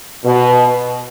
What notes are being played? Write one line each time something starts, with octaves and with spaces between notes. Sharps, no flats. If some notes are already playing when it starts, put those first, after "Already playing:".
B2